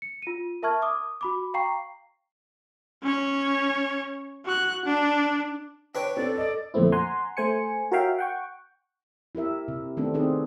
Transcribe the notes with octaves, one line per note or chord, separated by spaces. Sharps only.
C#7
F4 D#7
A#4 E5 A5 C#6 F6 G#6
D6 D#6
F#4 B5 D6
F5 G5 A#5 C#6 C7
C#4 C#5
F#4 F#6
D4
D4 B4 C#5 G5
C4 A4 D5
D5 D#5
F2 A#2 D3 A3 C4 E4
F#5 G#5 A#5 C6
A3 C5 G#5 C#7
F#4 A#4 C#5 E5 F5 G5
F#5 G5 C#6
E4 G4 A#4 E5
C3
D#3 A3 B3 C4 D4 A4
C4 D#4 G#4 B4 D5